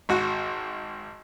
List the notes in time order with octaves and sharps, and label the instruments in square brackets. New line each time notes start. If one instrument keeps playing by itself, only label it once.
[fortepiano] G#1 F#4